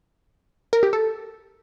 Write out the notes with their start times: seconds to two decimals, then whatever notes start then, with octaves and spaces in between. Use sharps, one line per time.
0.73 A#4
0.83 G4
0.93 A4